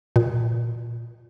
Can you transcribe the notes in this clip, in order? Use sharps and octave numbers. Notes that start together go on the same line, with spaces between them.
A#2